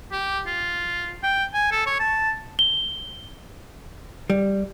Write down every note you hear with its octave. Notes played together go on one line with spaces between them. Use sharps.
G4
F4
G5
G#5
A4
C#5
A5
G7
G3